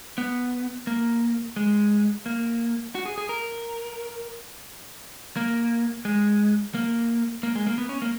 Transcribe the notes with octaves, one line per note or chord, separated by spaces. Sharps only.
B3
A#3
G#3
A#3
F#4
G#4
G#4
A#4
A#3
G#3
A#3
A#3
G#3
A#3
B3
C#4
A#3